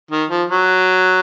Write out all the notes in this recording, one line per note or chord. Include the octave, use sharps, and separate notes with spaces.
D#3
F3
F#3